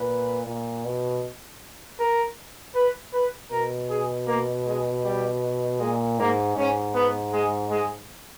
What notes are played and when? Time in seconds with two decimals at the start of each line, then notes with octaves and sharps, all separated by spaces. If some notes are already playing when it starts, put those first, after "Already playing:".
Already playing: A#2 B4
0.46 A#2
0.85 B2
1.99 A#4
2.75 B4
3.13 B4
3.51 B2 A#4
3.90 G#4
4.27 A#3
4.66 G#3
5.04 G3
5.80 A#2 G#3
6.19 G#2 A#3
6.57 G#2 C#4
6.94 B3
7.33 G#3
7.71 G#3